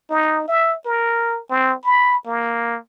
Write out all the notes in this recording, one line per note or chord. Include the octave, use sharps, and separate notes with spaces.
D#4
E5
A#4
C4
B5
A#3